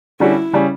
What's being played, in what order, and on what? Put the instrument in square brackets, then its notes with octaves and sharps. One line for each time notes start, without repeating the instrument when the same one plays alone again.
[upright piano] D3 G3 C#4 F#4 [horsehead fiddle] E4
[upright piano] C#3 G3 C#4